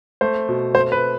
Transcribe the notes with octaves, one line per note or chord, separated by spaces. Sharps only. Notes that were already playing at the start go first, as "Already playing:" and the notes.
A3 C5
B2
A3 C5
B4